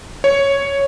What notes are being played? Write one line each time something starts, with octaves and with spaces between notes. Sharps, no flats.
C#5